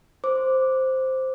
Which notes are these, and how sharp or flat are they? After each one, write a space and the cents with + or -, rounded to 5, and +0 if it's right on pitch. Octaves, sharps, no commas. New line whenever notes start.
C5 +0 D6 +0